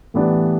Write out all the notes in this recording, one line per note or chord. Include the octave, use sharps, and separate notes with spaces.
A2 E3 G3 B3 D4